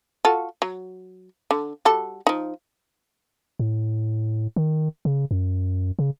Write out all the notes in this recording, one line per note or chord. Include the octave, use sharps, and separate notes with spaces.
F4 F#4 A4
F#3
D3
G3 F#4 A4
F3 D#4
A2
D#3
C#3
F#2
C#3